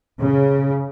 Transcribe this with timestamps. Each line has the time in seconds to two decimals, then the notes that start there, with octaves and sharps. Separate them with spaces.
0.22 C#3